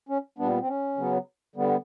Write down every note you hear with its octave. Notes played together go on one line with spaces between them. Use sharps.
C#4
A#2 G3 B3 D4
C4
C#4
C#3 F#3 B3
D3 G3 B3